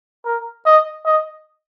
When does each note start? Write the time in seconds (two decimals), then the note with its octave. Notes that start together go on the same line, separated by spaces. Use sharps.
0.25 A#4
0.66 D#5
1.06 D#5